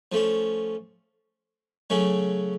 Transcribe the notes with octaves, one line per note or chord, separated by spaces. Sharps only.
F3 A3 C#4
C#3 F#3 A3 C#4